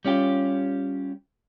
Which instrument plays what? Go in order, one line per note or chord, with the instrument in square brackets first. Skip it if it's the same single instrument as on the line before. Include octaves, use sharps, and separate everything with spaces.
[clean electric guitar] G3 C#4 F4 G4